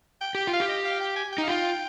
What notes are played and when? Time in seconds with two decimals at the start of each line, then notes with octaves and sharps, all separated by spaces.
0.21 G5
0.35 G4 G5
0.47 F4
0.53 F5
0.60 G4
0.68 D#5
0.85 F5
1.00 G5
1.16 G#5
1.33 G5
1.38 D#4 F5
1.48 F4 G5